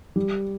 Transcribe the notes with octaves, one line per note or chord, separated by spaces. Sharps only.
G3